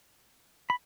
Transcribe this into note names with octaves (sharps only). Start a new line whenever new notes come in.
B5